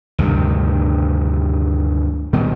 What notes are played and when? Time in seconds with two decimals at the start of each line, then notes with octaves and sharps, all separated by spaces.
0.18 D2 G2 C3 D#3
2.33 B2 D#3 G3